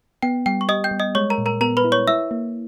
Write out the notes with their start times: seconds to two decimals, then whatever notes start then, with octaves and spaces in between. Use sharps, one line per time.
0.23 B3 G5
0.46 G3 G5
0.61 C#6
0.69 G4 D#5 D#6
0.84 G5 G6
0.91 G3
1.00 D#5 D#6
1.15 G#3 C#5 C#6
1.30 A#4 A#5
1.38 A#2
1.46 A#4 A#5
1.61 B3 A#4 A#5
1.77 B4 B5
1.84 E4
1.92 C#5 C#6
2.08 E4 E5 E6
2.31 A#3